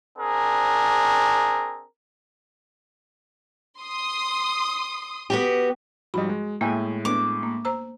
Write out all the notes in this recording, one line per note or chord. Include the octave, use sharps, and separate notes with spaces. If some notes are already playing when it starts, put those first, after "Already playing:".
C4 D4 G#4 A#4
C6 D#6
B3 F#4 G4
G#2 F3 G3 F#4 D#5 B5
G#3
A2 G#3 A#3 E5 G5 G#5
A3 B3 D4 D6
A#3
C5 A#5 E6